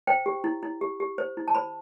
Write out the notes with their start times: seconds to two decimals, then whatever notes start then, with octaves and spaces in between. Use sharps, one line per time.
0.07 C5 G5
0.26 G4
0.44 E4
0.63 E4
0.81 G4
1.00 G4
1.18 C5
1.37 E4
1.48 A5
1.55 C5 B5